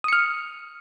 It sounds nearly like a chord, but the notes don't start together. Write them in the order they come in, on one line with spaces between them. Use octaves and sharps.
D#6 C#7 F6